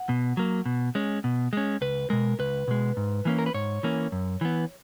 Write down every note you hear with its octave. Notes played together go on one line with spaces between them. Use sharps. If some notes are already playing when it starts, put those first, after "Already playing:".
Already playing: F#5
B2
F#3 A#3
B2
G#3 C#4
B2
G#3 C#4
C#2 B4
B2 G#3 A#4
C#2 B4
B2 G#3
G#2
E3 A#3 C#4
A#4
B4
G#2 C#5
E3 A#3 C#4
F#2
E3 B3